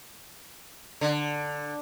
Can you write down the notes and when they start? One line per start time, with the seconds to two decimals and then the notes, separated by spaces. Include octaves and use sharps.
1.01 D3